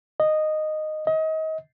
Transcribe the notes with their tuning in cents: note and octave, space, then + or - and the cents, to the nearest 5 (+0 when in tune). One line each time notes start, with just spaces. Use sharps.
D#5 -10
D#5 +30